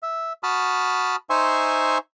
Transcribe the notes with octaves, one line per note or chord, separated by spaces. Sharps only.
E5
F#4 A5 B5 D#6 F6
D#4 C5 E5 G#5 C6 C#6